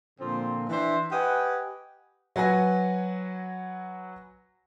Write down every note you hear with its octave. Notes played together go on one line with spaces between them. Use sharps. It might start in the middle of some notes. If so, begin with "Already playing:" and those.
A#2 D3 F3 C4
E3 D4 C5 E5
G4 B4 D#5 F#5 G#5
F#3 F#4 B4 G#5 A#6